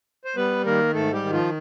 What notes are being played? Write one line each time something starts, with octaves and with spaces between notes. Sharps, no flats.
C5
G3 B3 B4
D#3 A#3 A#4
G#2 A3 A4
G3 G4
D#3
F3 F4